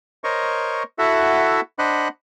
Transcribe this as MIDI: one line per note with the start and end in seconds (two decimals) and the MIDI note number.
0.24 0.83 70
0.24 0.83 72
0.24 0.83 73
0.24 0.83 75
0.24 0.83 85
0.98 1.61 64
0.98 1.61 66
0.98 1.61 69
0.98 1.61 76
0.98 1.61 78
1.79 2.08 62
1.79 2.08 72
1.79 2.08 75
1.79 2.08 78
1.79 2.08 83
1.79 2.08 90